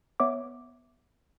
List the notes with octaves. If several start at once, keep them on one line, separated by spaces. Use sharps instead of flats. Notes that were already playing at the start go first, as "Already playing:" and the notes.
B3 C#5 E5 D6